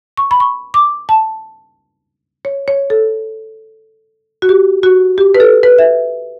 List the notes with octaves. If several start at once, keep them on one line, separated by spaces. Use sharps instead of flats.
C#6
B5
C#6
D6
A5
C#5
C#5
A4
F#4
G4
F#4
G4
B4
A4
B4
E5